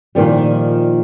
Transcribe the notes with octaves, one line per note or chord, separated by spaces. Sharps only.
A#2 D#3 F3 G3